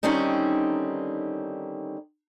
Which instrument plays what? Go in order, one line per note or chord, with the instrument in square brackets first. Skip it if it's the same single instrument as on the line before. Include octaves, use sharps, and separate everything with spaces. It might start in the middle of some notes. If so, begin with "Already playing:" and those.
[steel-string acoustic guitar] D3 D#3 G3 C4 C#4 D#4